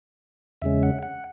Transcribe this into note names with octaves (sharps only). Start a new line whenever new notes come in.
E2 C#3 G#3 C#4 E5
F#5
F#5